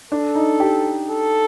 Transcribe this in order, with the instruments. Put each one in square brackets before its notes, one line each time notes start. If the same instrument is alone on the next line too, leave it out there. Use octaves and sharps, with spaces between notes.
[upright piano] D4 [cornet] A4
[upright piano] D#4
G4
[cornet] A4